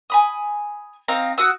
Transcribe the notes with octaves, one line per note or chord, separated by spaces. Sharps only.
G#5 B5 D#6
C4 D#4 F5 A#5
F#4 F#5 D#6 E6